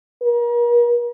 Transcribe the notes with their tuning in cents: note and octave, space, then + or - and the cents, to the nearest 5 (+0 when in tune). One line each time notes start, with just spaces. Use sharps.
A#4 +40